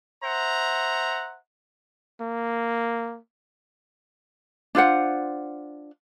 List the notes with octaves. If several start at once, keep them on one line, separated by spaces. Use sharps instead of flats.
C5 E5 F#5 A#5
A#3
D4 F4 C5 F#5